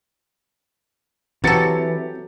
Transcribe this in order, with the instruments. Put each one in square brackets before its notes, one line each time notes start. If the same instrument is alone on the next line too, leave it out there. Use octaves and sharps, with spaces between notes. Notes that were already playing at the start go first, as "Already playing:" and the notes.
[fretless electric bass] E3 [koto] F#3 A4 [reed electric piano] C4 [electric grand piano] G4 A6 C#7